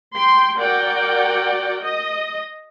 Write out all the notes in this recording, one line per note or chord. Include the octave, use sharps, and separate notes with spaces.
G5 C6
F#4 A#4 D5 F#5 G5
D#5